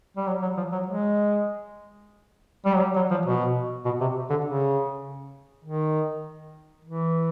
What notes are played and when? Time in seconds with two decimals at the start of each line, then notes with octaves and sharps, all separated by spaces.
0.17 G3
0.27 F#3
0.42 F#3
0.57 F3
0.72 F#3
0.86 G#3
2.66 G3
2.74 F#3
2.81 G3
2.96 F#3
3.11 F3
3.26 B2
3.85 B2
4.01 C3
4.30 D3
4.45 C#3
5.65 D#3
6.85 E3